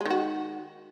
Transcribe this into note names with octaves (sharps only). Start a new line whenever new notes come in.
D#3 G#3 F#4